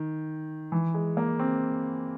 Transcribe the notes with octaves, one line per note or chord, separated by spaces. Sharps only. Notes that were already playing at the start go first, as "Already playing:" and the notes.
Already playing: D#3
E3
G#3
A#3
C4